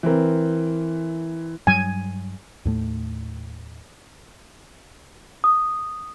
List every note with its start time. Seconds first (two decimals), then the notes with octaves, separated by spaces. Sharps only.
0.03 E3 C4 A#4
1.67 G2 F#3 G3 G#5
2.65 D#2 A2 A3
5.44 D#6